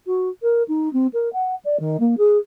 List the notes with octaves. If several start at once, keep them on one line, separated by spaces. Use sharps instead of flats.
F#4
A#4
D#4
C4
A#4
F#5
D5
D#3
A#3
G#4